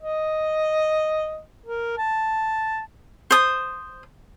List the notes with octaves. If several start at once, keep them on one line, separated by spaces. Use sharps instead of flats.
D#5
A#4
A5
C5 D#6